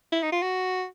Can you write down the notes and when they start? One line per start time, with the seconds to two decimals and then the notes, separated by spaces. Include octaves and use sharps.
0.12 E4
0.23 D#4
0.32 F4
0.42 F#4